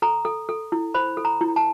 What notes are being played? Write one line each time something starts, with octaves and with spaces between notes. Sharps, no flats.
A4 A#5
A4
A4
E4
C5 B5
A4
A#5
E4
A5